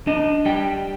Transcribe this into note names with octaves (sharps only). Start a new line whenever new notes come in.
D4 D#5
G3 G5